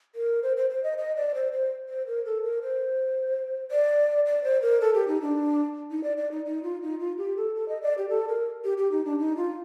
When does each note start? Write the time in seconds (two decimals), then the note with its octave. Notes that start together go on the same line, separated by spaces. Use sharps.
0.15 A#4
0.43 C5
0.57 C5
0.70 C5
0.83 D#5
0.98 D#5
1.16 D5
1.35 C5
1.52 C5
1.89 C5
2.07 A#4
2.25 A4
2.43 A#4
2.62 C5
3.71 D5
4.26 D5
4.44 C5
4.62 A#4
4.81 A4
4.94 G4
5.08 D#4
5.22 D4
5.91 D#4
6.04 D5
6.17 D5
6.31 D#4
6.46 D#4
6.63 F4
6.82 D#4
7.00 F4
7.18 G4
7.37 A4
7.55 A4
7.69 D#5
7.82 D5
7.98 G4
8.09 A4
8.28 A#4
8.64 G4
8.78 G4
8.92 D#4
9.05 D4
9.19 D#4
9.37 F4